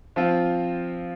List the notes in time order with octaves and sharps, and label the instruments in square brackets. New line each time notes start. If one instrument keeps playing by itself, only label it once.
[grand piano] F3 C4 F4